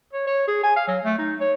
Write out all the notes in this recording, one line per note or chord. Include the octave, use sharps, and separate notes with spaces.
C#5
C#5
G#4
G#5
F5
F#3
A3
D#4
C#5